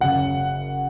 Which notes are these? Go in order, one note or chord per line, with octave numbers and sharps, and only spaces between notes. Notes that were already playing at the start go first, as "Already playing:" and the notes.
F#1 F#2 C#3 F#5